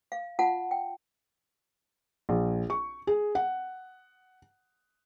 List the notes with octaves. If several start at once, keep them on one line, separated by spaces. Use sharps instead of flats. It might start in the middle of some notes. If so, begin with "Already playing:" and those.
F5
F4 F#5 A5
G5
A#1
C#6
G#4
F#5